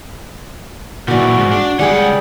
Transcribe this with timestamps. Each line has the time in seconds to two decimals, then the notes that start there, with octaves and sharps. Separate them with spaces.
1.08 A#2 E3 F#4 D5
1.38 G#2
1.51 D4
1.79 C#2 G3 G#4 F#5 G5